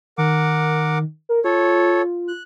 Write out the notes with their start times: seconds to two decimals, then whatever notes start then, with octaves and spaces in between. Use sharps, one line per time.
0.18 D#3 A#4 F#5 D6
1.29 A#4
1.44 F4 A4 C#5
2.28 F#6